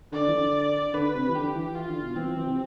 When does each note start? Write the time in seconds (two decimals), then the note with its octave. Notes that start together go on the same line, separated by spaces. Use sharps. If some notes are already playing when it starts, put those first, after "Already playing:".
0.12 D3 D5
0.28 E3
0.33 D3
0.94 D3 B4
1.14 C3
1.29 E3
1.34 D3 G4
1.55 E3
1.75 E3 F4
1.89 D3
2.02 B2
2.16 E3 C4
2.26 F3
2.36 E3
2.46 C3